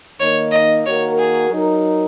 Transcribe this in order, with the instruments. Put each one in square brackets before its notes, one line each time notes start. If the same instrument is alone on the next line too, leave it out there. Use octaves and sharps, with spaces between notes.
[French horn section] D#3 A#3 D#4 [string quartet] C#5
[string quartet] D#5
[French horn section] D#3 A#3 F#4 A#4 [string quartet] C#5
[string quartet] G#4
[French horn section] F#3 D#4 A#4